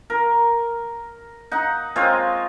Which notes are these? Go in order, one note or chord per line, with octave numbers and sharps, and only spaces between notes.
A#4
D#4 F#5
G#3 C4 F4 C#5